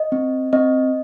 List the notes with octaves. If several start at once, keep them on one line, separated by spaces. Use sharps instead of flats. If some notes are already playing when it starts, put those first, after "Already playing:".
Already playing: D#5
C4
C4 D#5